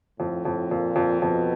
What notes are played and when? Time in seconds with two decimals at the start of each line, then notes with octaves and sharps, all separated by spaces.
0.19 F2 A2
0.45 F2
0.71 F2 A#2
0.96 F2
1.21 F2 B2